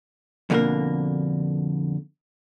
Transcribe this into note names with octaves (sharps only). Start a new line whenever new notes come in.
F2 B2 D3 A3 A#3 A#4